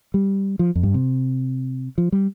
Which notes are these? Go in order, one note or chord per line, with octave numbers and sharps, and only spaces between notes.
G3
F3
F2
G2
C3
F3
G3